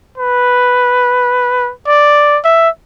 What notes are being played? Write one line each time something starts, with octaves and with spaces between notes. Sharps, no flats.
B4
D5
E5